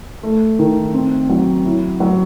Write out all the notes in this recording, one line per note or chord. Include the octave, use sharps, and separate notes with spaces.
A3
D#3
C4
F#3
E4
F#3